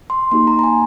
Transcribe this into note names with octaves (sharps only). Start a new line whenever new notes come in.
C6
A#3 D#4 G4 C6
A#5
A#5
G#5